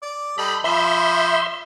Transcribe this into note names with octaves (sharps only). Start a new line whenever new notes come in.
D5
G3 A4 D#5 B5
F3 E5 B5 C6